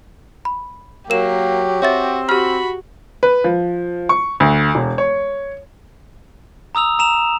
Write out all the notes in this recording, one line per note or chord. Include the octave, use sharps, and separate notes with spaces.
B5
F#3 A#3 G4 A#4 E7
C4 F#4 C#5 E5 A6
F#4 G4 B5 F6
B4
F3
C#6
D2
E1
C#5
A#5 D#6 E6 F7
A#5 E7 F7